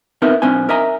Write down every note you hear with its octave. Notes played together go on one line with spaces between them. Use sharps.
B3 C4 D#4 A#4 E5
B1 C4 D4 D#4 G#5
A#4 D#5 E5 G#5 A#5